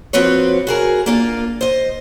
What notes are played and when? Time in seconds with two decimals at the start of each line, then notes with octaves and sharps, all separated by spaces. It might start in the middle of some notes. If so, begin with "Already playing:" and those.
0.13 F3 C4 F#4 B4 C#5
0.67 F#4 G#4 A#4
1.06 A#3 D4 F4
1.61 C5 D#5